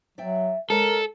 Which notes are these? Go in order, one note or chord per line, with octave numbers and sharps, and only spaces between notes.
F#3 D5 E5 G5
G#3 A4 A#4 C#5